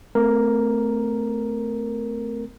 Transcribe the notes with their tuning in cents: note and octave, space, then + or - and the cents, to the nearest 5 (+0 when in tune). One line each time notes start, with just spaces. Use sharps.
A3 +0 C4 -35 A#4 +0